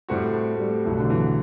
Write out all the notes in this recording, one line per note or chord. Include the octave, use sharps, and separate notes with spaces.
A2 G3 A3 C4 F#4
A3
A3
G3
B1 B2 F#3 A3 E4
D3
E3